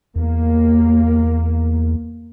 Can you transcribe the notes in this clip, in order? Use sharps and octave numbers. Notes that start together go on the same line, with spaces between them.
E2 A#3